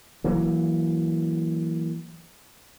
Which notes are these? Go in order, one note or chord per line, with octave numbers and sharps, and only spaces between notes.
E3 F#3 A#3